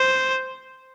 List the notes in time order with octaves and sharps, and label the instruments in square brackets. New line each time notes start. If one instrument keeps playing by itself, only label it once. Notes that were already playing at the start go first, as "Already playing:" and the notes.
Already playing: [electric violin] C5